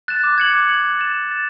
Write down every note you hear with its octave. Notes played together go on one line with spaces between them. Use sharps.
F#6 A6 E7
D6
G#6 C#7 F#7
D6
G#6 C#7 F#7
F#6
A6 E7
F#6
A6 E7